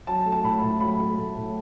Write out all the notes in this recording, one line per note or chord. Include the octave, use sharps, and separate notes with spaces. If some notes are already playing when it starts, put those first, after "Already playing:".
F#3 A5
A3
A5
A2 B5
A2
F#3 B5
A3
A2
A2